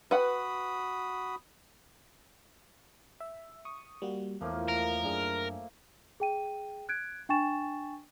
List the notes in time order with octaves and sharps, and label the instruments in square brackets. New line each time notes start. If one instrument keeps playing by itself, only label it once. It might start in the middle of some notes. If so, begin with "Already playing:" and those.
[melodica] F#4 B5 D#6 [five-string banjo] B4 F#5
[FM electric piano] E5
C#6 D#6
G3 A#3 F#4
[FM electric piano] E2 [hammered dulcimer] A2 F3 A#3
[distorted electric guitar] A#4
[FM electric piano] F#2 D4 G#4
[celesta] G#4 G5 D#7
F#6 G#6 D7
D4 G5 G#5 C#6 A6 E7